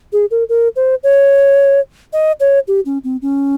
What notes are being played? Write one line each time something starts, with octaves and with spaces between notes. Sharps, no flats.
G#4
A#4
A#4
C5
C#5
D#5
C#5
G4
C#4
C4
C#4